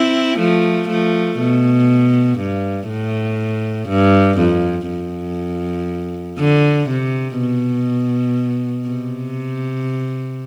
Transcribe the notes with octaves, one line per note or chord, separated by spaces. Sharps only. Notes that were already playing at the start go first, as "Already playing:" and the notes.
Already playing: C4 E4
F3 A3
F3 A3
B2
G2
A2
G2
F2
F2
D3
C3
B2
C3